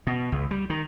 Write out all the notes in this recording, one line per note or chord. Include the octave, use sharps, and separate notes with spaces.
B2
C#2
G3
D#3